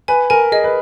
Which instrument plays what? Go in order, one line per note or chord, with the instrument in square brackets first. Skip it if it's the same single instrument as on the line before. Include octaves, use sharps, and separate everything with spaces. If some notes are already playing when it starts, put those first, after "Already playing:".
[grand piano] B4 [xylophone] G#5
[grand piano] A#4 [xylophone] G#5
[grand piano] G#4 [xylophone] D#5
[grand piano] B4